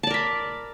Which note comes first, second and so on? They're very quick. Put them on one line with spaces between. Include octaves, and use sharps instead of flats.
A5 D5 A#4 B5